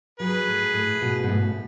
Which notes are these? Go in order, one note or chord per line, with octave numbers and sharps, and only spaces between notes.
F#3 G#4 B4
A2
A2
B2
G#2
A2